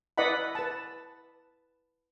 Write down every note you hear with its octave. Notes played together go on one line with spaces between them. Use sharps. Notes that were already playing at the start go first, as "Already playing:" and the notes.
E4 B4 D5 D#5 F#5 B5
B4 A5